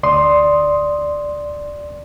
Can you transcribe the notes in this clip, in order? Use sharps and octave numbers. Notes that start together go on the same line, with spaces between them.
D2 D5 C6 D#6